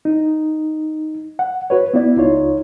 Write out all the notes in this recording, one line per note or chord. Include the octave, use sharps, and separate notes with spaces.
D#4
F#5
F#4 B4 C#5
B3 E4 D5
C#2 D#4 F4 C#5